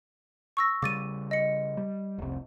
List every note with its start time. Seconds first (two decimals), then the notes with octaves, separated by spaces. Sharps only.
0.57 C#6 E6 A#6
0.83 C#3 G3 D6 A6 D#7
1.31 D#5 C#7
1.77 G3
2.18 F1 C2